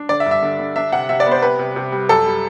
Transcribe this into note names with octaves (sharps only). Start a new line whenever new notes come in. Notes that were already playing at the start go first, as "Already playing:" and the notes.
Already playing: D4
D3 D5
E5
G2
E5
D3
D3
D4 E5
C3 F#5
C3 E5
D5
B3
C5
C3 B4
C3
C3
G3
F#2 A4
G3